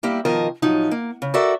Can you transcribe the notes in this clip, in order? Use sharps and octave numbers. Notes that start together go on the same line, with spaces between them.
G3 A#3 E4 G4
B2 D#3 F3 A#4 D#5 A5
A2 F3 F#3 D#4
A#3
C#3
F#4 A4 A#4 D5 E5